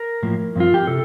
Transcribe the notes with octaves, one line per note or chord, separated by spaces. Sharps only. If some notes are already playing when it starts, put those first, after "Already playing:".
Already playing: A#4
A2 F3 A#3
G2 F3 C4 F4
G4
C3 A4